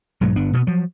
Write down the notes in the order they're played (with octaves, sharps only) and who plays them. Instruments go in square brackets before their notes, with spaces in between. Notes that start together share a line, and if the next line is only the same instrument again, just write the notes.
[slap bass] B1 G#2 F#3 A3
G1 B3 D4
B2 A#3 B3
F3 F#3